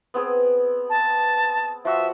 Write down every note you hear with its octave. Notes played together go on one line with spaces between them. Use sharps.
B3 C4 G#4
A5
F3 F#4 E5 E6